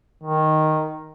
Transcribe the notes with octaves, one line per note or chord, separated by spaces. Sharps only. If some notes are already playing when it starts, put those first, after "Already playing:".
D#3